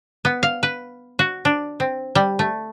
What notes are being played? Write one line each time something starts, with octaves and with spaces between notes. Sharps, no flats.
B3
F5
B4
F#4
D4
C4
G3
A3